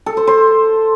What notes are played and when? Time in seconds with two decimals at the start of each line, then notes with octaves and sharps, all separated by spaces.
0.06 A4
0.17 C5
0.27 C5